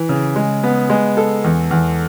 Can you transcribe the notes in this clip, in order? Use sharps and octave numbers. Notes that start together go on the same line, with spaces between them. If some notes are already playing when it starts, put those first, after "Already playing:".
Already playing: E3
C#3
G#3
B3
G#3
A4
E2
E2